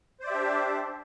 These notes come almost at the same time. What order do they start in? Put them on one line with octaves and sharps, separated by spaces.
C5 D5 E5 G4 D4